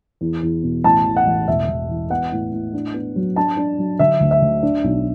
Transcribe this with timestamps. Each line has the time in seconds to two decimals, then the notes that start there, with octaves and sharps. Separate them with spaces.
0.21 E2
0.43 E2
0.63 B2
0.84 A1 A5
1.06 E3
1.16 F#5
1.26 A1
1.47 E1 E5
1.69 E1
1.89 E3
2.10 B3 F#5
2.32 A2
2.52 A2
2.74 D4
2.94 B3
3.16 F#3
3.36 D4 A5
3.57 D4
3.78 F#3
3.99 D3 E5
4.20 D2
4.31 E5
4.42 D2
4.63 D4
4.84 B1